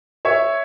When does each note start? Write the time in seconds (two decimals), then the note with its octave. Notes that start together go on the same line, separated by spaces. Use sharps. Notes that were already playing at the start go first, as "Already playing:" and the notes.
0.25 C#5 E5